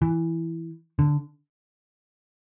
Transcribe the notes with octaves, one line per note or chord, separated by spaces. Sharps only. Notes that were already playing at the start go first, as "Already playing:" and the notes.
E3
D3